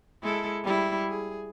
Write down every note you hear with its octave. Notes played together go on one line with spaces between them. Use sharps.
G#3 E4 A4
G3 E4
G#4